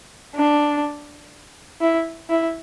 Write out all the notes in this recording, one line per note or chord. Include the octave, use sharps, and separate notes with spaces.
D4
E4
E4